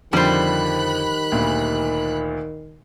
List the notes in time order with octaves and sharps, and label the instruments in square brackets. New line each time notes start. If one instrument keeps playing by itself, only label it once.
[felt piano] F2 D3 F3 [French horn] D#3 [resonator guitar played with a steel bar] G3 C5 [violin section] B5 F#6
[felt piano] D2 A#2